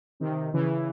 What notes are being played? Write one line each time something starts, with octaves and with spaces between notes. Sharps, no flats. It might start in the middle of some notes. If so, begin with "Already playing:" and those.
C3 D#3
C#3 E3